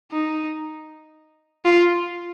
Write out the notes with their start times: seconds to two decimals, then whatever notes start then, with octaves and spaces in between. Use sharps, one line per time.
0.12 D#4
1.65 F4